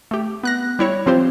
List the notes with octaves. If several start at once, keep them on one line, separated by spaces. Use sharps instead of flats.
A3 G4
B3 F#6 A#6
G3 E4 C#5
F3 C4 F4 G4 C5